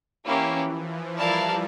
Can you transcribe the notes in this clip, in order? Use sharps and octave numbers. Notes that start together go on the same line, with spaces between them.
E3 A#3 C#4 E4 G4
F3
E3
G3 E4 A#4 D5 F5 A5